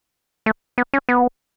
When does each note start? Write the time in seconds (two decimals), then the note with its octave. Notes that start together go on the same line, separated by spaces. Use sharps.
0.46 A3
0.78 B3
0.94 C#4
1.09 B3